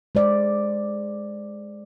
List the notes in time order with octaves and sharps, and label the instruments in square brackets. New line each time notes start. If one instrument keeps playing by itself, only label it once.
[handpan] G#3 C5 D5